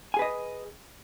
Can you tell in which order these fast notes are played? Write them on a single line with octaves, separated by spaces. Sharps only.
G#5 G#4 B4 D#5